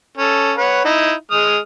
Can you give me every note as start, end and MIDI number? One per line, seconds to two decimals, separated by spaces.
0.17 0.52 61
0.17 0.52 69
0.58 0.83 71
0.58 0.83 73
0.58 0.83 78
0.85 1.13 63
0.85 1.13 64
1.31 1.58 56
1.31 1.58 87
1.31 1.58 89